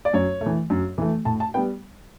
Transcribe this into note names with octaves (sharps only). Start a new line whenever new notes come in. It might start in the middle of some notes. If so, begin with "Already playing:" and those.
D5
F#2 C#5
A3
E3
F#2
E3 A3
A2 A5
A5
G3 B3 G5